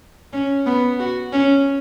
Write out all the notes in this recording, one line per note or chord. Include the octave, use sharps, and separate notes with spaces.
C#4
B3
F#4
C#4